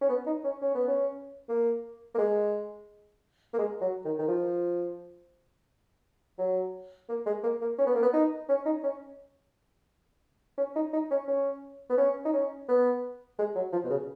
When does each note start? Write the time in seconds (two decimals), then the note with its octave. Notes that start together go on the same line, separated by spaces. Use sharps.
0.01 C#4
0.09 B3
0.26 D#4
0.44 C#4
0.62 C#4
0.75 B3
0.87 C#4
1.49 A#3
2.14 A#3
2.18 G#3
3.53 A#3
3.59 G#3
3.81 F#3
4.05 D#3
4.19 D#3
4.28 F3
6.38 F#3
7.09 A#3
7.26 G#3
7.43 A#3
7.61 A#3
7.78 C#4
7.87 B3
7.95 A#3
8.02 B3
8.13 D#4
8.49 C#4
8.65 D#4
8.83 C#4
10.58 C#4
10.76 D#4
10.93 D#4
11.11 C#4
11.28 C#4
11.89 B3
11.97 C#4
12.25 D#4
12.33 C#4
12.68 B3
13.39 G#3
13.55 F#3
13.73 F3
13.84 B2
13.90 C#3